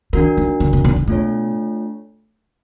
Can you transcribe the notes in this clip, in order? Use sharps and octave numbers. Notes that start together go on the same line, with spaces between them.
D#3 D4 F#4 A#4
D#3
D3
C3
B2
C3
B2 A3 D4 F4 A4 C#5